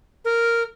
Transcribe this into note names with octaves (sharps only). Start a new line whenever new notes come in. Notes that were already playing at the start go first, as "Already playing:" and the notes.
A#4